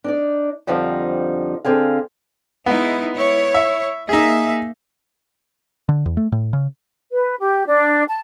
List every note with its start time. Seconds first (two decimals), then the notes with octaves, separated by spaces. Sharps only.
0.04 D4 D#4 D5
0.67 F2 D3 F3 G3 D#4
1.64 D3 C4 G#4 F5
2.66 G#3 B3 D#4 E4
3.15 E4 C#5
3.54 E5
4.09 A#3 D#4 G#4 E5
5.89 D3
6.06 E2
6.17 A3
6.32 A2
6.53 C#3
7.11 B4
7.38 G4
7.66 D4
8.07 A5